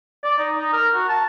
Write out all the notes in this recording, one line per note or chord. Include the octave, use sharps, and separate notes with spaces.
D5
D#4
D#4
A#4
F#4
A5